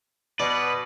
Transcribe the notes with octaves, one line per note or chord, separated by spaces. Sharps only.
B2 B4 D5